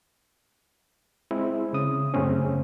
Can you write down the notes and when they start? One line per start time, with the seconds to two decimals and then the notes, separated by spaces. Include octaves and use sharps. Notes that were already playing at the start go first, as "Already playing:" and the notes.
1.31 G#3 C4 E4
1.73 C#3 D#6
2.14 F#2 C#3 A3 C4 C#4